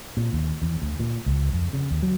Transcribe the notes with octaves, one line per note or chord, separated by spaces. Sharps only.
A#2
D#2
E2
D2
A#2
C#2
F2
C#3
D#2
F#3